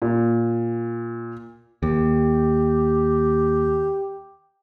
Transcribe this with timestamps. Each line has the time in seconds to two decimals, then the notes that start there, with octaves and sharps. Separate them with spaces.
0.02 A#2
1.83 D#2 G4